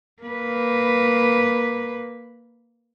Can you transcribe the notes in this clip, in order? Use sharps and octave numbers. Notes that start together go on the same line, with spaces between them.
A#3 B4